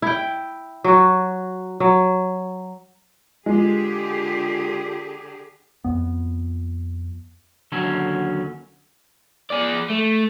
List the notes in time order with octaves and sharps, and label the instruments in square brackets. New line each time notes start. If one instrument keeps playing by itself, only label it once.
[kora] E4 G5
F#3 F#4
F#3
[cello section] D3 G4 G#4 [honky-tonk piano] G#3 [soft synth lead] F4
[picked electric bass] F2 B3
[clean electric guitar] D#2 D3 F#3 C#4 A4
[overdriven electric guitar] G#4 D5
A3